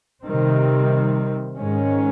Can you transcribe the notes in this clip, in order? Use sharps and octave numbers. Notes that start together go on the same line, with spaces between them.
C3 D#3 G3 C4
G#2 D#3 G#3 C#4